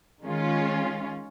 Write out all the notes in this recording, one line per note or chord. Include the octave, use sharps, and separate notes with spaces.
D#3 G#3 C#4 F4